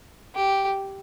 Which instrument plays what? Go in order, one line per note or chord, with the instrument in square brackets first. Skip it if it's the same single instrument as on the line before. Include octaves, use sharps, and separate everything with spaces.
[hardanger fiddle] G4